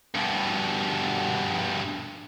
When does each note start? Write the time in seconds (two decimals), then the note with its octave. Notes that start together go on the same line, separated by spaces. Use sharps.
0.15 G2 B2